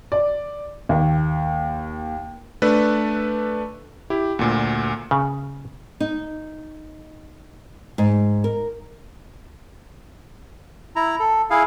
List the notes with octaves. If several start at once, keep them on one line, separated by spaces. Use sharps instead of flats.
D5
D#2
A3 D4 A4 B4
E4 G4
D2 A#2
C#3
D#4
G#2
A#4
E4 A#5
A4
E4 G#4 F5